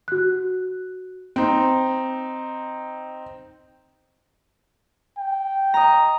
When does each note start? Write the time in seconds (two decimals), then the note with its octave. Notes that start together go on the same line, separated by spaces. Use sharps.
0.08 F#4 F#6
1.36 C4 D#4
5.18 G5
5.74 D#5 A#5